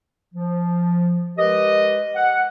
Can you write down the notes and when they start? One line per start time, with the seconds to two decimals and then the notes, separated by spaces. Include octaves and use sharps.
0.34 F3
1.38 G#3 G4 A#4 B4 D#5
2.15 F#5